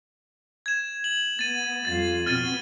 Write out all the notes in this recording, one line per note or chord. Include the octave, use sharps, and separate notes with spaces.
G#6 E7
F#7
B3 A6 D#7
F2 G3 F4 A6
B2 B3 C4 F6 A6 D#7